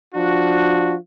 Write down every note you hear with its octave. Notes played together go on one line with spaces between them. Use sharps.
F3 D4 F4 F#4